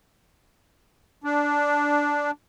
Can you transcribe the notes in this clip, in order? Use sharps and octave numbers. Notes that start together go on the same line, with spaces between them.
D4